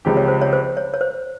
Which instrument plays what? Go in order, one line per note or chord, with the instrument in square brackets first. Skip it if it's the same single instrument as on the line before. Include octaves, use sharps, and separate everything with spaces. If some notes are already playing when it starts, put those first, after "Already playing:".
[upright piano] C#2 C#3 F3 C4 G4
[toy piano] C#5
C5
C#5
C5
C#5
C#5
C5